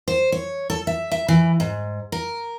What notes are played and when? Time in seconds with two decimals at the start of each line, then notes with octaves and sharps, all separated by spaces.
0.08 C5
0.32 C#5
0.70 A4
0.87 E5
1.12 E5
1.28 E3
1.60 G#2
2.12 A#4